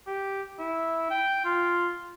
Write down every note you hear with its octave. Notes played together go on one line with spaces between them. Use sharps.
G4
E4
G5
F4